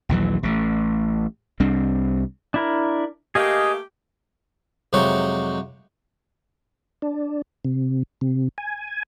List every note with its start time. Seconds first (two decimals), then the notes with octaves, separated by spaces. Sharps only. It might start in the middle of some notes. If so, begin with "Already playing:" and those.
0.09 A#1 D#2 E3 F#3
0.43 A1 A3
1.60 C2 G3 C4 D4
2.54 D4 E4 A#4
3.35 A3 A#3 G4 G#4 D#5 F5
4.93 F2 C3 F#3 G#3 D#4 C#5
7.02 D4
7.65 C3
8.21 C3
8.58 G#5